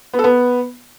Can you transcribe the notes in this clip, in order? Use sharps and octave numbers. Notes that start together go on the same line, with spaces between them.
B3
A4
B3